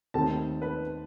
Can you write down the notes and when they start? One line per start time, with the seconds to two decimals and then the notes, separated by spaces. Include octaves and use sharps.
0.14 D#2 D#3 A3 C4 A5
0.62 B4